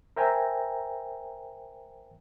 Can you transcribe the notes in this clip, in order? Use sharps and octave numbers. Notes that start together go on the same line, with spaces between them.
A#4 C5 E5 G5 G#5 A#5